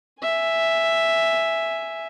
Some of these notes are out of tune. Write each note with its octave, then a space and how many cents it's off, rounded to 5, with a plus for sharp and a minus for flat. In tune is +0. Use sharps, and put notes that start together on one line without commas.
E5 +0 G#5 +0